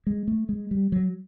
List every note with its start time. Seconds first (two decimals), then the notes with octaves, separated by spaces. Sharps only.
0.07 G#3
0.28 A3
0.49 G#3
0.71 G3
0.92 F#3